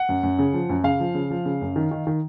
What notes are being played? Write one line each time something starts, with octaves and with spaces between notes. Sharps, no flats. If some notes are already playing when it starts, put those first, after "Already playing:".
Already playing: F#5
F#2
F#2
C#3
F3
F#2
C#3 F5
F3
C#3
F3
C#3
F#2
D#3
D#3
D#3